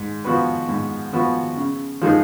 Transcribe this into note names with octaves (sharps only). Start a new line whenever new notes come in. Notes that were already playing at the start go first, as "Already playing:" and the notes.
Already playing: G#2
F3 B3 F#4 B4
G#2
F3 B3 F#4 B4
C#3
F3 G#3 D#4 G#4